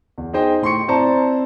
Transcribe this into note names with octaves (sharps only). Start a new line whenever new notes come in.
E2
D#4 G#4 C5 D#5 G5
A2 C6 C#6 C#7
C4 E4 C5 D5 A5 A#5